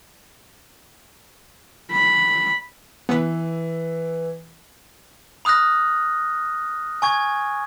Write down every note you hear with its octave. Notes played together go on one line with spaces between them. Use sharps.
B5
E3 B3 B4
B5 D#6 F6 F#6 A#6
G#5 C#6 G#6